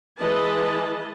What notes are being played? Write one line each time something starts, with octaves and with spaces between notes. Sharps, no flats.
E3 G#3 B4 D#5 A5